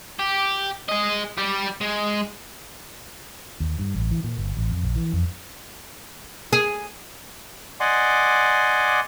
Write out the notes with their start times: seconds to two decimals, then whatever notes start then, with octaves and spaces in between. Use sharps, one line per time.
0.19 G4
0.89 G#4 D#5
1.38 G3 G4
1.81 G#3
3.60 D#2
3.79 G2
3.95 A1
4.11 E3
4.24 A#2
4.37 G1
4.57 A1
4.71 F2
4.83 A#1
4.96 E3
5.13 F2
6.53 G#4
7.80 D5 D#5 F#5 G#5 C6 D6